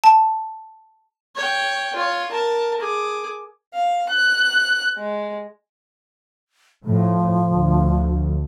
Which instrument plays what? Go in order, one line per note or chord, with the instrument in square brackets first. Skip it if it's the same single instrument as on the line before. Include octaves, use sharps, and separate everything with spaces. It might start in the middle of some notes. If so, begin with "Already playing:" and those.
[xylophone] A5
[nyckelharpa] C#5 G5
F4 C#5
A#4 A5
G#4 D6
[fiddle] F5
F#6
G#3
[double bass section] A2 [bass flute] F3
[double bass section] D2